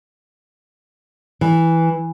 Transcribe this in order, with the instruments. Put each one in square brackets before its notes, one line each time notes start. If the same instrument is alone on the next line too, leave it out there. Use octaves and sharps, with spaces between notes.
[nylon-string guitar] E3